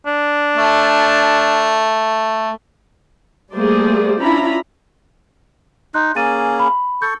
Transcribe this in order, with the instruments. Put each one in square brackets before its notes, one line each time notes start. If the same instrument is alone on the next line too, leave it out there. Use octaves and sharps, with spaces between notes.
[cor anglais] D4
[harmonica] A3
[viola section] G3 A3 A#3 G#4 C5 D5
C#4 D4 E4 F4 A#5 B5
[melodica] D#4 [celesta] C6 F#6
[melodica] A#3 C#4 G#4 [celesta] G#5 A6 D#7
[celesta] B5
[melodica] A4 C#6 [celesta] G6